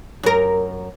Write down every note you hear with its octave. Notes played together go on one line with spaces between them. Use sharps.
F#2 A#4